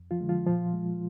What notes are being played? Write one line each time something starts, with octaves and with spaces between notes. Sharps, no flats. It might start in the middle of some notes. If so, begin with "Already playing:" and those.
Already playing: F2
F3 F4
D3 G#3
F3 F4
A#2 F3 F4
G#3